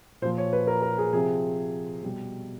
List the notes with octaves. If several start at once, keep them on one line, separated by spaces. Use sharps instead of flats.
A#2 F3 C5
C#5
B4
A#4
A#4
G#4
C3 F3 G#4
B2 G3